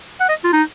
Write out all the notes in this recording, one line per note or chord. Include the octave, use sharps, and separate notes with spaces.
F#5
D#5
F4
D#4